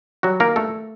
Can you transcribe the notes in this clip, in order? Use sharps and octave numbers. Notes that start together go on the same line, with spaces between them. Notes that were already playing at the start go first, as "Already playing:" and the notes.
F#3 G3 F#4
D#3 A#3 A#4
G2 A3 A4